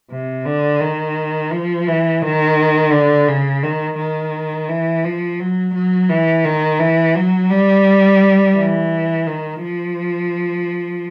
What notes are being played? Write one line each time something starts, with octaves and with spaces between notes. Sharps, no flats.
C3
D3
D#3
F3
E3
D#3
D3
C#3
D#3
D#3
E3
F3
F#3
F#3
E3
D#3
E3
F#3
G3
E3
D#3
F3